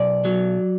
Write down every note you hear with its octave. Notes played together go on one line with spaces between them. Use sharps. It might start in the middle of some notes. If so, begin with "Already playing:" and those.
Already playing: B1 D5
F#3